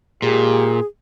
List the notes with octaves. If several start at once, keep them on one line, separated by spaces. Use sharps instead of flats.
A#2 G#3 G4 G#4